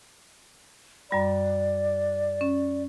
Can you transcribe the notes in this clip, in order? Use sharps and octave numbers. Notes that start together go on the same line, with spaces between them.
F#2 G3 D5 B5
C#4